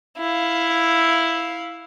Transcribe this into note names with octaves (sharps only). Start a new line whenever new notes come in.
E4 F5